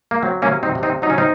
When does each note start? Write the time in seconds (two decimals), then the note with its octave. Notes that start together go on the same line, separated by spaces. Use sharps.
0.11 A#3
0.23 F#3 C4
0.42 A#3 C#4
0.49 C3
0.63 C4 D#4
0.75 C3
0.83 C4 D#4
1.02 F#3 D#4
1.10 C#4
1.18 C4 D#4